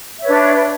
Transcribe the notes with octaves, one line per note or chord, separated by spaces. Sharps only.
D4 B4 C#5 E5